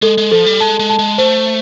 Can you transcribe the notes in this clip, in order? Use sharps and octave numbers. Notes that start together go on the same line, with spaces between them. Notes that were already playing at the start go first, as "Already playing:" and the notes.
G#3 A4
G#3
F3 A4
G3
G#3 A5
G#3
A5
G#3
A3 C5